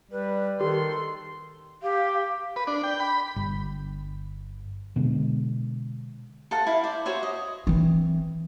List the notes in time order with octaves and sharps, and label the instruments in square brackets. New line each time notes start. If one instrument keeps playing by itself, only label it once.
[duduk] G3 [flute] B4
[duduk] D#3 [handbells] G4 [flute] A4 [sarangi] C6
[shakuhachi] G4 [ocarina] F5
[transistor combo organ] B4
D4
G5
B5
[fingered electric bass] G1
B2 D3 G#3
[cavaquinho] A4 C5 F5 F#5
E4 F5
C5 D5
F#4 C5 C#5 E5
D#5
[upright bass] E3 C4